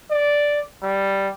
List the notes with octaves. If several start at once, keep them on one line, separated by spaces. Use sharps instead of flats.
D5
G3